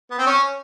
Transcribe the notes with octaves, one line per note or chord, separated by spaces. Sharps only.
B3
C4
C#4